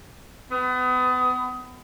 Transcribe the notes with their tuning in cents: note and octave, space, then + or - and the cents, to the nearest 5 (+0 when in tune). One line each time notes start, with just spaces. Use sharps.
B3 +30